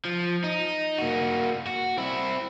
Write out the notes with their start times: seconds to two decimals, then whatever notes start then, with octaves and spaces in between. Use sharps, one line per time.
0.05 F3
0.44 D#4
0.98 A#3 F#4
1.67 F#4
1.98 C4 E4